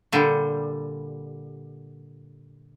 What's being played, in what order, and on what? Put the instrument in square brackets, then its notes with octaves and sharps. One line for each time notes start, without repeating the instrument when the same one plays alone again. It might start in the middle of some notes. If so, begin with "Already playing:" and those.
[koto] A#2 D3 G3